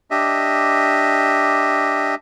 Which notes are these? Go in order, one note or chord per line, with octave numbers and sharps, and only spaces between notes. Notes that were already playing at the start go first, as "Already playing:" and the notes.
D4 G4 D#5 E5